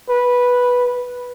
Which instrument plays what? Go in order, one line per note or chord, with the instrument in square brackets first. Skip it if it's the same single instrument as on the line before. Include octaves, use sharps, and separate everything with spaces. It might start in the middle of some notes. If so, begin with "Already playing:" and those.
[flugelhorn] B4